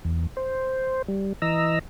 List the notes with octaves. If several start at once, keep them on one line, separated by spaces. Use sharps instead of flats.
E2
C5
G3
E3 D#5 A#5 E6